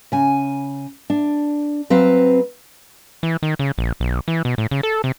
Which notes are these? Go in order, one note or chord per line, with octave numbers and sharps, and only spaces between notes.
C#3 G#5
D4
F#3 C4 B4 F5
E3
D#3
C#3
A#1
B1
E3
B2
A2
C#3
A4
C3